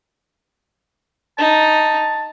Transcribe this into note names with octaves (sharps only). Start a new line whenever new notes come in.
D#4 A5